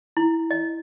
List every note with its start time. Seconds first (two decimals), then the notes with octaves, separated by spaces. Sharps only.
0.17 E4
0.51 D#5